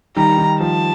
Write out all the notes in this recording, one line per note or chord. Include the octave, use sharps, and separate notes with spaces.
D#3 G3 A#5
D#3
F3 A5